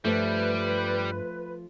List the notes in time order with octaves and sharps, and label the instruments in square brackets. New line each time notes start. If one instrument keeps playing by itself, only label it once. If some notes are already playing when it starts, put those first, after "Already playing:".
[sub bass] G2 [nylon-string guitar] F3 A3 [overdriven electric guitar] G3 [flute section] B4